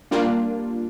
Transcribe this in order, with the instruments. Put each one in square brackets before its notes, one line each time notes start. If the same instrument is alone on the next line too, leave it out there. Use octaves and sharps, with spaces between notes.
[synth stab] G3 A#3 D4 F4